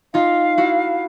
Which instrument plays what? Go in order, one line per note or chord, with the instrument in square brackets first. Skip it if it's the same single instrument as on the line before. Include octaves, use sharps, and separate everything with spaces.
[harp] D#4 F4 [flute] F5
[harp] E4 F#4